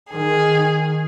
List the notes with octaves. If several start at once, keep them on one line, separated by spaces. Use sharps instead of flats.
D#3 G#4